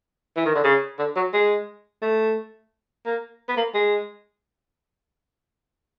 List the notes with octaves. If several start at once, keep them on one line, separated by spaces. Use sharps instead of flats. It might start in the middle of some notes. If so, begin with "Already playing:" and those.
E3
D#3
D3
C#3
D3
F#3
G#3
A3
A#3
B3
A#3
G#3